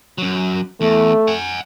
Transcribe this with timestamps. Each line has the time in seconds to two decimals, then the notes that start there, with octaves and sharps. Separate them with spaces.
0.18 F#2 F#3
0.81 E2 A3
1.27 F#5 G#5